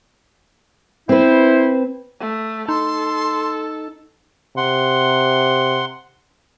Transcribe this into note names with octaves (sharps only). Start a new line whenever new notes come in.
C4 E4 B4 C5
A3
D#4 A4 C6
C3 F#5 C6